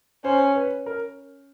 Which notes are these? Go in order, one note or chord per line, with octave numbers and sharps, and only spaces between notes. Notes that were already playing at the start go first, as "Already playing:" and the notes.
C#4 C5
B4
A#4